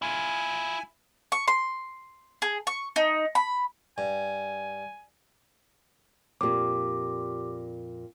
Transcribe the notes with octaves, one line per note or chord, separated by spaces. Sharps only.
E4 F4 G#5
C#6
C6
G#4
C#6
D#4
B5
G2 G#5
F2 A#2 G4 D6